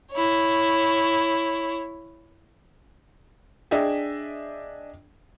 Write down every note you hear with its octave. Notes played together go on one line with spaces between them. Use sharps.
E4 C#5
D4 G#4 D#5 E5 G5